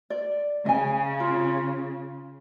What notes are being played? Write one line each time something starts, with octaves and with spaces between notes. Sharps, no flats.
D5
C#3 D#5 G#5
F4